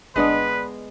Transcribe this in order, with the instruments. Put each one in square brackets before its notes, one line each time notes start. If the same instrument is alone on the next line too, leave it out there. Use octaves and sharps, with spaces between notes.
[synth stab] G1 D4 D#5 [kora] G#3 B3 [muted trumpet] B4